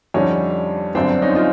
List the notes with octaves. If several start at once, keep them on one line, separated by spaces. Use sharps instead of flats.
F2 D3 G3 C#4 D#4
G1 F#2 D3 C4 D4
C#4 D#4
D#4 F4